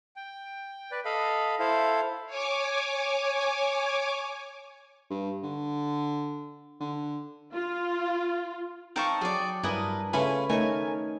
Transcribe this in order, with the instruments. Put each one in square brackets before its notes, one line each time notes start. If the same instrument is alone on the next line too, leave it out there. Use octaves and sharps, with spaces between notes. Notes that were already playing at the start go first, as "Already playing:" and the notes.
[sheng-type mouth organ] G5
B4 D5
A4 D#5 F5 B5
E4 A4 C5 F5
[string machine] C#5 G#5 D6
[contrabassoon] G2
D3
D3
[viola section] F4
[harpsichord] C4 [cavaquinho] D#4 F5 [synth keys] G5 A5 C#6
[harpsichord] F#3 [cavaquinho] G#4 D5
[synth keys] G2 D#6 [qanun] D4 A#4 G#5 [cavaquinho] E4 B4
[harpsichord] C#3 A3 F4 [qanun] C#4 B4 C#5 [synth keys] G#5 [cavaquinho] B5
[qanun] D#3 C#5 [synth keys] A3 A#4 G#5 [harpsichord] C#6